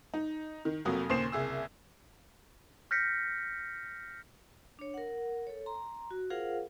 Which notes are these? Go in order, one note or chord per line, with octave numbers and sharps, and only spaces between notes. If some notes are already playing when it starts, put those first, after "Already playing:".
D#4
D#3
F1 F2 F#3 A#3 D#6
D#2 A#2 C#3 C5 C7 E7
F#1 C2 G#4 E6
F6 G6 A#6 B6 C#7
D4 C#5
A#4 F#5
A4 C#5
A#5 C6
F#4
F4 G#4 A#4 C5 F5 F#5